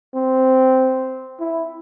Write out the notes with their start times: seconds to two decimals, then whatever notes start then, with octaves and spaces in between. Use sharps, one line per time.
0.14 C4
1.40 E4